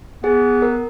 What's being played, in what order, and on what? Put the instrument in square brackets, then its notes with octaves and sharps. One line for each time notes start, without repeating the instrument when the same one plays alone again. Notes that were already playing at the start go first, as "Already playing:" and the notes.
[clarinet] B3 [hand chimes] G#4
[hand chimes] A#4